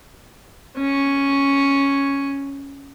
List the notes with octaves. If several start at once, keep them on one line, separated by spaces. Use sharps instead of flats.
C#4 C#6